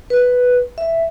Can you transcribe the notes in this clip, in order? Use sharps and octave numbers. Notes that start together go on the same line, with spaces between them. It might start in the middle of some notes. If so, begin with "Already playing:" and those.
B4
E5